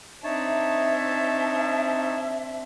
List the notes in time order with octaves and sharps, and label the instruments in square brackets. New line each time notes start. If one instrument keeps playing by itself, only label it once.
[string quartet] C4 D4 [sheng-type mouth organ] D#4 C#5 A5 [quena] E5